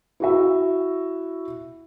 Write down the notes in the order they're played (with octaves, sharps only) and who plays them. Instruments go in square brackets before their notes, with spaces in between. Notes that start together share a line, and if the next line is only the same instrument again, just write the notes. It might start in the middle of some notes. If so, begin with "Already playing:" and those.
[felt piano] E4 F#4 E5